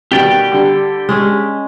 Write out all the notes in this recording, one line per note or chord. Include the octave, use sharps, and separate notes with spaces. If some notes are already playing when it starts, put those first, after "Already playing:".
B2 D#3 G3 G4 D5 G5
D3 G3
G#3 C#4